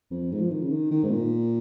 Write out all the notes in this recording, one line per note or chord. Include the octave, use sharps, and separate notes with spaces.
F2
G#2
F3
D#3
C#3
D#3
D#3
G#2
A#2